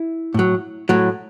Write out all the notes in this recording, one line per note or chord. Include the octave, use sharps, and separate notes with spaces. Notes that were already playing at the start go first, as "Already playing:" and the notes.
Already playing: E4
A2 F#3
A2 F#3